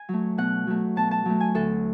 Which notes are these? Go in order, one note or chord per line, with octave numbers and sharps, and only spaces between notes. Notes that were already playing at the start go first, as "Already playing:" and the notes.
Already playing: G#5
F#3 A3
B2 F#5
F#3 A3
B2 A5
A5
F#3 A3
G#5
D2 A4